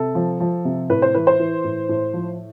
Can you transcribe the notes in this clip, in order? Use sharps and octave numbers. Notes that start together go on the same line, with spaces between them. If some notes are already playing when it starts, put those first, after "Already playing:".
Already playing: C3 A4
F3
F3
C3
A2 B4
C5
E3 B4
C5
E3
A2
A2
F3